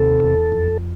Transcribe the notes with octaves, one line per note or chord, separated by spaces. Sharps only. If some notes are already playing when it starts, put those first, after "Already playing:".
Already playing: D#2 C3 A4
E2
F2